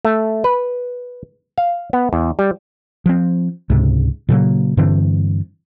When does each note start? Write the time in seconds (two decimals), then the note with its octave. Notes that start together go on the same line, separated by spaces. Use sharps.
0.05 A3
0.44 B4
1.58 F5
1.93 B3
2.13 E2
2.39 G3
3.06 F3 C4
3.70 C#2 G#2 C3
4.29 A#2 C#3 F#3 A#3
4.77 G2 D3 E3 C4